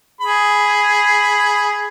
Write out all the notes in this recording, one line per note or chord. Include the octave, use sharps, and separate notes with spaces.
G#4 B5